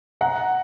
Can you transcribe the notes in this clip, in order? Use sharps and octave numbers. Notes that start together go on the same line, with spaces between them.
F#5 A#5